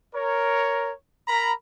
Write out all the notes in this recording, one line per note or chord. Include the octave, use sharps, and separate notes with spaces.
A#4 C#5
A#4 A#5 B5